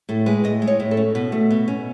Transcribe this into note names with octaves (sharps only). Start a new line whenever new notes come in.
A2 A4
G#3 B4
A2 D#5
G#3
C#5
A2
A4
C#4
B2
A3
B2
C#4